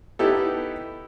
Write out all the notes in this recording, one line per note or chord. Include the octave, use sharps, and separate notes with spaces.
B3 D#4 E4 G4 A4